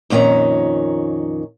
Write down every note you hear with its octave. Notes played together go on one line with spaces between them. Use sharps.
F2 A#2 D#3 C#4 A#5